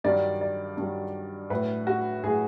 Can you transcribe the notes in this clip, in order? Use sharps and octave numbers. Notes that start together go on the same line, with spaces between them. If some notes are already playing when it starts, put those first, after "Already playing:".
G2 D#3 F#3 D5
D5
G2 D#3 F#3
A2 F#3 B4
F#4
A2 F#3 G#4